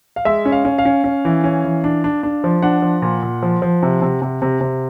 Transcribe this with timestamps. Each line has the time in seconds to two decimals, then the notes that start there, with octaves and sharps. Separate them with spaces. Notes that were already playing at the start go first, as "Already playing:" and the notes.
0.16 F5
0.25 G#3 E5
0.45 C#4
0.52 F5
0.65 C#4
0.78 F5
0.85 C#4
1.04 C#4
1.25 E3
1.44 C#4
1.65 E3
1.84 D4
2.04 D4
2.23 D4
2.44 F3
2.62 D4 F#5
2.82 F3
3.02 A#2
3.23 A#2
3.43 F3
3.62 F3
3.83 C3
4.02 C3
4.22 C3
4.42 C3
4.61 C3